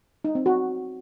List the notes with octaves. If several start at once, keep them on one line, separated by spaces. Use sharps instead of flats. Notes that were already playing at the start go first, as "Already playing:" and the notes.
D#4
C4
F#4